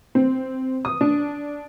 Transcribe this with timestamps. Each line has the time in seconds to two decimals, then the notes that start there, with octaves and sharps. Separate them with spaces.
0.15 C4
0.85 D#6
1.01 D4